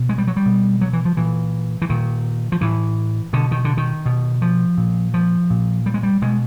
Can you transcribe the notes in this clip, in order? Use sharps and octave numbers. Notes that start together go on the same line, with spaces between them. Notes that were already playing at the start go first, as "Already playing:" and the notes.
Already playing: B2
G#3
G3
F#3
G3
B2
F#3
E3
F3
A#2 E3
E3
A#2 D#3
F3
A2 E3
B2 D3
D#3
D3
D#3
B2
F3
A#2
F3
A#2
G3
G#3
G3
B2 G#3